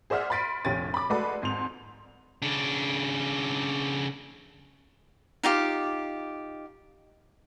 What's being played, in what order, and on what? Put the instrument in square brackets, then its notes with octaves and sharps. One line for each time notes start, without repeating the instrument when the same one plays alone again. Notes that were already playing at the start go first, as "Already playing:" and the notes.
[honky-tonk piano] G#4 C5 D5 E5 F#5 F6
B5 C6 A6 B6 D7 D#7
F1 A#1 G4 C#5 A6 D#7
B5 D6
G#3 A3 F#4 A4 B4 D5
F2 G#2 C6 F7
[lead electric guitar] C#3 D4
[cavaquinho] D#4 F4 G4